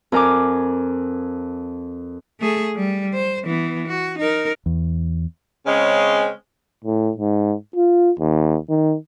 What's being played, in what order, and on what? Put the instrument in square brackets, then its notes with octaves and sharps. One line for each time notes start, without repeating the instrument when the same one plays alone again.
[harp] F2 A#4 G#5 D6
[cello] A3 G#4
G3
C5
E3 B3
F#4
D#4 A#4
[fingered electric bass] E2
[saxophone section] C#3 G#3 C4 C#4
[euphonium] A2
G#2
F4
D#2
D#3